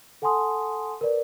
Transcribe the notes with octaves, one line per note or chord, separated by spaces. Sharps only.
A4 F#5 G#5 A5 C6 D#6
A#4 B4 D5